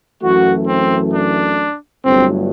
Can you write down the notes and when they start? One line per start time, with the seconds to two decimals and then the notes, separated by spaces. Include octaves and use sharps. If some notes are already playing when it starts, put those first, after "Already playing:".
0.21 F#2 E3 A3 F#4
0.67 C4
1.14 D4
2.05 G1 G2 F#3 A3 C4